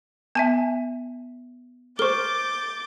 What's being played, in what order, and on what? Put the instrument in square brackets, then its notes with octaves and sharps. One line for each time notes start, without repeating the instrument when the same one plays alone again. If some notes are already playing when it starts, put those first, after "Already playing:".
[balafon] B3 [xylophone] E5 G#5 A5
[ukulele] A#4 C5 [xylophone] C#6 G7 [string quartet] D6 G6 A6